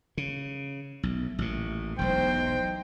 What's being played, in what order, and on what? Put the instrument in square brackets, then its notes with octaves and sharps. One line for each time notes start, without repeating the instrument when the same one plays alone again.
[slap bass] C#3
[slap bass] B1 [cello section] A3
[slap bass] A1 A#2
[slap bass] E1 B1 [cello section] E3 D#4 C5 [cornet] G5